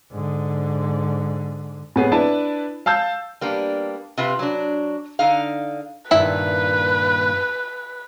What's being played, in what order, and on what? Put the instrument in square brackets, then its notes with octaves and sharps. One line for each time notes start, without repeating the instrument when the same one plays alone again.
[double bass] G#2 D3
[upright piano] A2 B3 G#4
D4 E4 B4 A5
F5 A5 E6 G6
[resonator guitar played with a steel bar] G3 A#3 B3 D4
C3 F4 B4
F#3 D4
D3 D#4 F5
[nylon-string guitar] G2 A#2 D#3 [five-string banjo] E4 E5 [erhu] B4